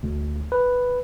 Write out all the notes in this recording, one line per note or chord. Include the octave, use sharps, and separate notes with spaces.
D2
B4